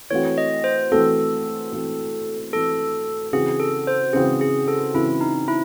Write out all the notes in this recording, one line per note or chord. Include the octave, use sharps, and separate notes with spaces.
E3 A3 C4 F#4 C#5
D#5
C5
E3 A3 C4 F#4 A4
E3 A3 C4 F#4
E3 A3 C4 F#4 A4
C#3 E3 C4 F#4 G#4
A4
C5
C#3 E3 C4 F#4 G#4
G#4
A4
C#3 E3 C4 E4 F#4
D#4
E4